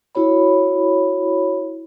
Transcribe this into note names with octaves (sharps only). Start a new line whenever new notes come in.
E4 F#4 C#5 B5